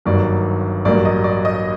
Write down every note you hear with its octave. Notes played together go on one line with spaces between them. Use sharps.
G1 G2 D#3 F#3 A#3 D5
A1 G2 F#3 A#3 D5
D#5
D5
D#5